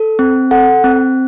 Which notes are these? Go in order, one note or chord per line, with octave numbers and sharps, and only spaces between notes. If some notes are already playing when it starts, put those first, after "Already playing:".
Already playing: A4
C4
A4 F#5
C4